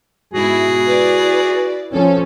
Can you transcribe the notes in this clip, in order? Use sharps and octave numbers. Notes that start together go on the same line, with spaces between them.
G#2 B2 E4 F#4 G#4
E4 B4 D5
F3 C#4 A4